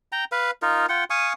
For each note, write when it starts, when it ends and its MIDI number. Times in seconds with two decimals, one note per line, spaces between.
0.12 0.24 79
0.12 0.24 82
0.32 0.51 71
0.32 0.51 77
0.62 0.86 63
0.62 0.86 65
0.62 0.86 70
0.89 1.04 65
0.89 1.04 78
0.89 1.04 79
1.10 1.33 77
1.10 1.33 80
1.10 1.33 85
1.10 1.33 87